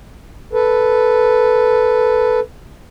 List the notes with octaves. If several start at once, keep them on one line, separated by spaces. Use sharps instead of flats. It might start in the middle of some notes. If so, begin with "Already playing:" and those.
A4 B4